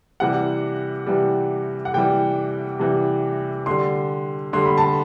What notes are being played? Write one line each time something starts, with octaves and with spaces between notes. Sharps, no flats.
C3 E3 G3 F#5
C3 E3 G3
F#5
C3 E3 G3 G5
C3 E3 G3
D3 G3 C6
D3 G3 C6
B5
A5